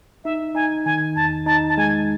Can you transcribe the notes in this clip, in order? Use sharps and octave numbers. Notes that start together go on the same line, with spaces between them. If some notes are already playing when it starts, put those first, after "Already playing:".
D#4 E5
D#4 G#5
D#3 G#5
E2 A5
D#4 A5
A5
G#3 G#5